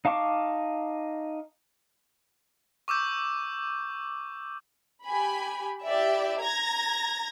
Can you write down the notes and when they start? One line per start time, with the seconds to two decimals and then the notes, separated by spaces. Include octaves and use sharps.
0.05 D#4 F5 A5 C#6 D6
2.88 C#6 D6 E6 G6
5.05 G4 G#5 B5
5.85 E4 G4 D5 E5
6.41 A#5 G#6 A#6